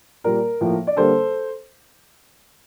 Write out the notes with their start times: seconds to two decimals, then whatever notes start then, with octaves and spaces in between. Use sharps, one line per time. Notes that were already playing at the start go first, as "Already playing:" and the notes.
0.24 A#2 G3 A#3 A#4
0.61 A2 F3 A#3
0.87 D5
0.96 D3 G3 A#3 A4 C5